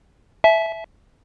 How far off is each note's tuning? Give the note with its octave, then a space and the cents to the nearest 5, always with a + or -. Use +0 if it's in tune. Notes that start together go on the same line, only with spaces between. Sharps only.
E5 +0 A5 -45